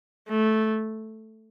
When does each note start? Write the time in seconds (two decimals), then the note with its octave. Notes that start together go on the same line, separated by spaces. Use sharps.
0.29 A3